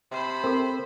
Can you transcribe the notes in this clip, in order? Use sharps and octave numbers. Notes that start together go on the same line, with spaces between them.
C3 C5 B5
C4 A4 A#4